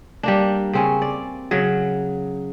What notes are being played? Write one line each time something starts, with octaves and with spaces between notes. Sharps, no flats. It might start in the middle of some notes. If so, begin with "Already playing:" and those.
G3 A#3 D4
C#3 C4 C#4
D5
C#3 F#3